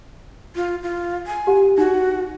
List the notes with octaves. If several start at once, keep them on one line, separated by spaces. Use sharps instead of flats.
F4
F4
G#5
G4 F#5
D#4 F#4